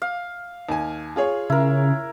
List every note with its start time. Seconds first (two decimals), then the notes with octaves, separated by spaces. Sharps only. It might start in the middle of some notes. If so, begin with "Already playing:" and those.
0.02 F5
0.69 D#2 G#5
1.16 F4 G#4 C#5
1.50 C#3 E4 A#4